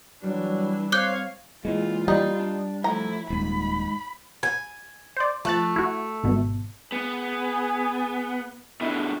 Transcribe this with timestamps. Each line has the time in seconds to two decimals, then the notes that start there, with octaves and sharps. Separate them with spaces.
0.23 E3 F#3 G3 D4
0.92 C4 C#5 F5 D6 F#6 G6
1.65 A#2 E3 G#3 F4
2.08 G3 D#4
2.39 D4
2.84 F3 A3 E4 A#5
3.30 D#1 G#2 B5
4.43 G#5
5.17 C5 D5
5.45 F3 A3 F#6 A6
5.76 E4 F#4
6.23 G#1 B2
6.92 B3 G#4
8.81 B2 D3 E4